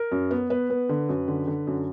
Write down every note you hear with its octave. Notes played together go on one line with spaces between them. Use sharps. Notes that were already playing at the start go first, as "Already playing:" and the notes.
Already playing: A#4
F#2
B3
B3 B4
B3
D3
F#2
D3
D3
F#2